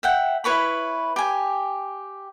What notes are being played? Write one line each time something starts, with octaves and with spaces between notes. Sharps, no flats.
E5 F#5 G5
E4 B4 C#5 B5
G4 G#5